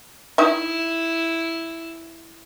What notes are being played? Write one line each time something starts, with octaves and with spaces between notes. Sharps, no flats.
D#4 E4 E5